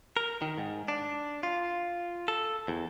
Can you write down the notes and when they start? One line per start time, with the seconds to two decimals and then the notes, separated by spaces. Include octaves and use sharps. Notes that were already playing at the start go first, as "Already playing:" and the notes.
0.17 A#4
0.42 D#3
0.58 G#2
0.88 D4
1.43 F4
2.28 A4
2.68 E2